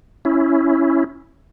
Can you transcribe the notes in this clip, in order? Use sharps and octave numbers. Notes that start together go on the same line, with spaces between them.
C#4 E4